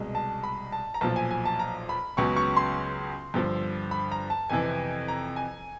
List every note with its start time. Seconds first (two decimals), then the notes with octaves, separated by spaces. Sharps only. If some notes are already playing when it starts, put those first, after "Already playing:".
Already playing: C2 B2 G#3
0.15 A5
0.43 B5
0.72 A5
0.94 A#5
1.01 B1 A#2 F3 A5
1.16 G#5
1.31 G#5
1.45 A5
1.59 A#5
1.89 B5
2.17 C#2 C#3 F#3 B3 C#6
2.36 C#6
2.56 C6
3.34 G2 D3 F3
3.91 B5
4.12 A#5
4.30 A5
4.49 F2 C3 E3 G#5
5.08 A#5
5.36 G#5